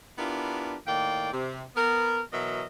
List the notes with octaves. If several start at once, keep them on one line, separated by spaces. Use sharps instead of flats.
B3 D4 E4 F4 G4 A#4
A2 D#3 A#3 D5 G5
C3
B3 A#4
B2 E3 F#3 A#4 D#5 E5